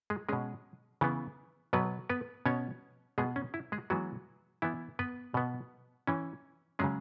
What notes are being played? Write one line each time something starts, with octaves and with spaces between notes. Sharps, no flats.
G#3 G#4
B2 G#3 C#4 G#4
C#3 E3 B3
B2 F#3 B3 B4
B3 B4
B2 B3 C#4 C#5
B2 G#3 B3 G#4
C#4
E4
G#3 G#4
E3 F#3 G#3 B3 F#4
E3 B3 E4
B3 B4
B2 B3
E3 C#4
C#3 F#3 G#3 C#4 G#4